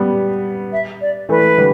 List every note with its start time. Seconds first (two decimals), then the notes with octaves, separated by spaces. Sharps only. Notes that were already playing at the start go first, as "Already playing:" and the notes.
Already playing: G3 B3
0.72 E5
1.01 D5
1.29 E3 A3 B4
1.58 D3 G3